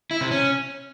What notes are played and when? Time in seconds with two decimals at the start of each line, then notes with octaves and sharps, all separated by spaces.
0.11 E4
0.21 C3
0.31 C#4